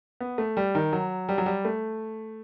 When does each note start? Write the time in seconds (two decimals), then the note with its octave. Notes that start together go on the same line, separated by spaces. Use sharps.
0.20 B3
0.38 A3
0.57 G3
0.75 D#3
0.93 F#3
1.29 G3
1.38 F#3
1.46 G3
1.65 A3